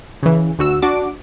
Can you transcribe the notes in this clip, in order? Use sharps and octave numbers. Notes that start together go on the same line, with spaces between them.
C#3 E3
D2 F#4 E6
D4 F#4 D6